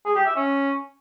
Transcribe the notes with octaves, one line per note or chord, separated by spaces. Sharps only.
G#4
G4
E5
C#4